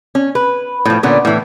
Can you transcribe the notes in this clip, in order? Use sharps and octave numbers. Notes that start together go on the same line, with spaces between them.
C#4
B4
A2 F3
A#2 D3 B3 C#4
A2 E3